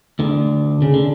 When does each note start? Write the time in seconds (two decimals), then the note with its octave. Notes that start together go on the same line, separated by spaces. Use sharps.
0.19 D2 D3
0.82 C#3
0.94 D3